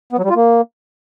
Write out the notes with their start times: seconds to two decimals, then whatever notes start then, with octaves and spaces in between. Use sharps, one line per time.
0.13 B3
0.18 F#3
0.24 G3
0.30 F4
0.36 A#3